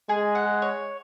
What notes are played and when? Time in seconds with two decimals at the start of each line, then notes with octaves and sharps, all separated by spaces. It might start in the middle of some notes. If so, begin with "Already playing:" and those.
0.09 G#3 G#4
0.35 F#5
0.62 C#5